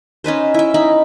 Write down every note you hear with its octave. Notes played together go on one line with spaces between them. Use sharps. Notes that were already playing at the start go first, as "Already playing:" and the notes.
C#4 D#4 B4 C5
E4 E5
D#4 E4 B5